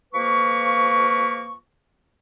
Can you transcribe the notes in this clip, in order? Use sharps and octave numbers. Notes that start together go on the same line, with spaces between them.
F2 F3 A#3 B4 C#6